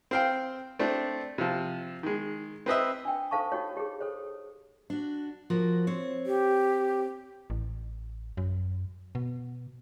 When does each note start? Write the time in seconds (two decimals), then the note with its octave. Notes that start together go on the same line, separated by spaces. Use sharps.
0.11 C4 F5 G5
0.79 A3 C4 D4
1.38 C3 F3
2.03 D#3 G#3
2.66 C4 B4 D#5 E5
3.05 D4 G5
3.31 D#4 A4 C5 F5 A5 C#6
3.52 D#4 F#4 G4 C#5
3.77 G4 G#4
4.00 A4 C5 C#5
4.90 D4 F#4
5.50 F3 F#4 A#4
5.87 C4 C#5
6.26 G4
7.50 A1
8.37 F#2
9.15 B2